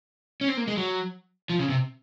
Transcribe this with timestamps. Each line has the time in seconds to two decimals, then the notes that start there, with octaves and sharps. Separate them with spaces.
0.41 C#4
0.48 C4
0.57 A#3
0.68 G#3
0.77 F#3
1.50 F3
1.60 C#3
1.70 C3